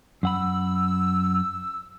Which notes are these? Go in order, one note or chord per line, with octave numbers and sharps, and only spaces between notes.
F#2 F#5 B5 E6